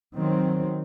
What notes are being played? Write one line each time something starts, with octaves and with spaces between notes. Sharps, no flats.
D#3 F#3 C4